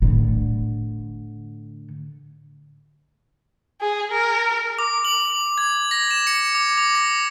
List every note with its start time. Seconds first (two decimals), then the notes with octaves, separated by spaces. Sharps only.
0.02 A2 D3
3.81 G#4
4.12 A#4
4.78 D6
5.05 F#7
5.58 G#6
5.91 A#6
6.11 E7
6.27 C#7
6.55 D6
6.77 D6
6.95 A#6